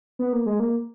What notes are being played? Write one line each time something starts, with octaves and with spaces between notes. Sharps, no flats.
B3
A#3
G#3
A#3